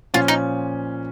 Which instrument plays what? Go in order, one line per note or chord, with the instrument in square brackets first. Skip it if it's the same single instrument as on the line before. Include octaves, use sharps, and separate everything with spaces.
[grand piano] A#2 F3 C#4 [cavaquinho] F4
[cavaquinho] D#4